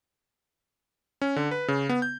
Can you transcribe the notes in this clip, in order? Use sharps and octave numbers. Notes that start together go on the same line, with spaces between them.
C#4
D3
B4
C#3
B3
G6